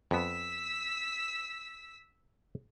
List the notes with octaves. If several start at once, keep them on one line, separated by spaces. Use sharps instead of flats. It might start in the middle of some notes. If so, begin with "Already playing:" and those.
F2 B3 E6 B6